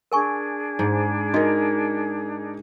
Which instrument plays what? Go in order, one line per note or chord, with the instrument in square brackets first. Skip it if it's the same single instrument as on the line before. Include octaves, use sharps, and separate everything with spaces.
[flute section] D4 G#4 [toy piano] A#4 G#5 C#6
[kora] G#2
[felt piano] D#4 A#4 [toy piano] F#4 D#5